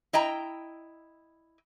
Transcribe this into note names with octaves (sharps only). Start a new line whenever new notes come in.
E4 D#5 G5 A#5